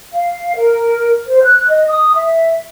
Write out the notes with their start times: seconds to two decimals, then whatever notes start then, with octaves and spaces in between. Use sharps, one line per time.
0.13 F5
0.56 A#4
1.28 C5
1.43 F#6
1.69 D#5
1.88 D#6
2.15 E5